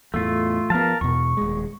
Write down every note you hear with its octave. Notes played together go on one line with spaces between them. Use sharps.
E2 A2 A3 F4
F3 B3 A#4 F5 A5
E2 B2 C#6
D#1 G#3